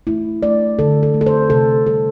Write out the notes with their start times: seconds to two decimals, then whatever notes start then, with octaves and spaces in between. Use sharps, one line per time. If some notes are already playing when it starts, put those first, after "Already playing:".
0.07 A3 E4
0.43 A3 D5
0.79 D3 A4
1.03 A4
1.14 A3
1.21 A4
1.26 C5
1.50 C3 A4
1.86 G3 A4